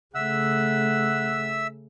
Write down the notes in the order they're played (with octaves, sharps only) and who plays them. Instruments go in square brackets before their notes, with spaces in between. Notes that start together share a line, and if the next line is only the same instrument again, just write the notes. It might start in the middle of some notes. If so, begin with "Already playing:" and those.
[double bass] C#3 A3 [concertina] E5 E6 [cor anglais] F#5